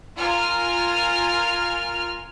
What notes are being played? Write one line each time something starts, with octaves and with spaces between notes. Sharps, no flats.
F4 A#4 G#5 F6